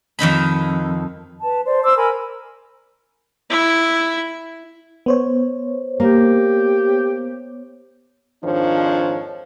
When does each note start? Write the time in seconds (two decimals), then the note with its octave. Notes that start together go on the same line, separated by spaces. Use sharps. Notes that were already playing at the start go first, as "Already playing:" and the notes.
0.19 F2 D#3 D#4 B5
1.42 B4 A5
1.64 C5 D5
1.83 C5 D6 E6
1.96 A#4 G#5 B5
3.50 E4 E5
5.06 B3 C5 C#5
6.00 A#3 G4
8.44 F2 G#2 D#3 F3 D4 C#5